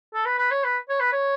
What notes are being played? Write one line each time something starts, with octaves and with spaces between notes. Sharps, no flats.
A4
B4
B4
C#5
B4
C#5
B4
C#5